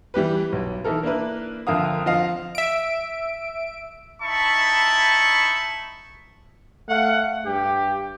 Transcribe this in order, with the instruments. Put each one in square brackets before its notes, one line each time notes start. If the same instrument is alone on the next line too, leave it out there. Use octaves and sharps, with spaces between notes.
[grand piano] E3 G3 G4 B4
B1
E3 D#4 A4 A#4
A#3 D4 E4 B4
F2 D3 A#4 E5 F5 D#6
F3 D#5 F5
[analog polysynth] E5 D7
[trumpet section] D#4 E4 E5 A5 B5 C#6
[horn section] A3 F5 F#5
G2 G4